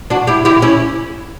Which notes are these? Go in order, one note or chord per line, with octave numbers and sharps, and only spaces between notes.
D4 F#4
E4 G4
E4 G4
C#4 E4